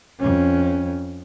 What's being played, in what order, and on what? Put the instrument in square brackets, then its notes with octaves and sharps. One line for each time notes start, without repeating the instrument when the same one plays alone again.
[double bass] F2 C#4